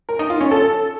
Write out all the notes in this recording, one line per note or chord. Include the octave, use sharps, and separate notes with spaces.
A#4
D#4
F4
C#4
A4